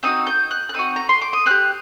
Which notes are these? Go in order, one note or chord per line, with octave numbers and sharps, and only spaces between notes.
C4 D#4 F#4 D#6
G6
F#6
F#6
C4 D#4 F#4 D#6
A#5
C6
D6
D#6
C4 G4 F#6